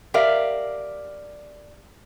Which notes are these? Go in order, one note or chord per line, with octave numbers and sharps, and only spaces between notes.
G4 A#4 D5 E5 F5